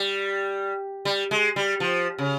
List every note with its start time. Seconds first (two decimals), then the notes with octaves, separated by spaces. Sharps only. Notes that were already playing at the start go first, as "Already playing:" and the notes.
Already playing: G3
1.05 G3
1.31 G#3
1.56 G3
1.80 F3
2.18 C#3